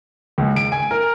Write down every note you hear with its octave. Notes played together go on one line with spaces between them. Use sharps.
C#2
D7
G#5
A#4